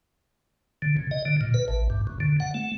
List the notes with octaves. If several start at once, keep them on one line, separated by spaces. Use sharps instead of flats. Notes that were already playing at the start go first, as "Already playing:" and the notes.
D3
C#3
D#5
D3
A#2
B4
A1
G2
F#2
D3
F#5
A3